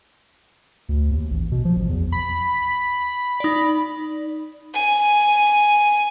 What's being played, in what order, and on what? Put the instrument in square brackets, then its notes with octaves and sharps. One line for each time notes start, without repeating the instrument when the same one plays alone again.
[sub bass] D2
D#2
A1
B2
F3
A1
E2
[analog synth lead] B5
[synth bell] D#4 D5
[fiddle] G#5